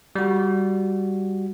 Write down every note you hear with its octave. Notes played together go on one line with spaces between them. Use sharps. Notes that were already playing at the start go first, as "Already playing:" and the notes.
G3 F#4